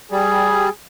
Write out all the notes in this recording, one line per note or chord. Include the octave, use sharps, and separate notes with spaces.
G3 G#4